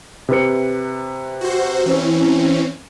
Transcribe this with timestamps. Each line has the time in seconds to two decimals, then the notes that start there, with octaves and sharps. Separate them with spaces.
0.29 C3 B4 C#7
1.41 F#4 C5
1.86 E3 C4 C#4